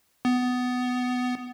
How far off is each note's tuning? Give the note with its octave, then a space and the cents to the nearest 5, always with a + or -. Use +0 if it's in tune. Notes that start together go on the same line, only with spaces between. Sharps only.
B3 +15